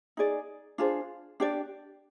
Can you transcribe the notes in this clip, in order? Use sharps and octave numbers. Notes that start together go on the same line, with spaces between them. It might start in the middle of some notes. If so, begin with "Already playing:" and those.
D#4 G#4 D5
D4 F4 G#4 C5
D4 G4 D5